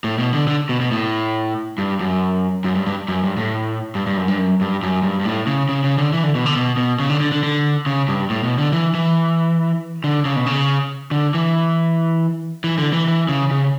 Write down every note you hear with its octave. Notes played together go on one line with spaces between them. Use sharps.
A2
B2
D3
D3
B2
B2
A2
G2
F#2
F#2
G2
G2
F#2
G2
A2
G2
G2
F#2
G2
F#2
G2
F#2
G2
G2
A2
C#3
C#3
C#3
D3
E3
D3
B2
D3
B2
B2
C#3
D3
D3
D3
D3
C#3
G2
A2
B2
D3
E3
E3
D3
C#3
B2
C#3
D3
E3
E3
D3
E3
E3
C#3
C#3